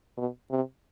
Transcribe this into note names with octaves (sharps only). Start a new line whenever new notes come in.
B2
C3